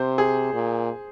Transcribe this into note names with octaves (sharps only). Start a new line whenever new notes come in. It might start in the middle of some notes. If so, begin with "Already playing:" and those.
Already playing: C3 C5
G#4
A#2